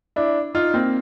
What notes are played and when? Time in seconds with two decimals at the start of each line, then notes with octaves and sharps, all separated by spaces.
0.16 D4 E4
0.55 D#4 F4
0.74 A#3 C4